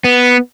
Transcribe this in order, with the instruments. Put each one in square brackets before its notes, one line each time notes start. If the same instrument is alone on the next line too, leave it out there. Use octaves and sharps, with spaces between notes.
[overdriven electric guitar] B3